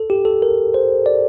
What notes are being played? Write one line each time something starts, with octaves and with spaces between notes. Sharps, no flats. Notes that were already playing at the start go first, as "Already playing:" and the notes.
Already playing: A4
G4
A4
A#4
C5
D5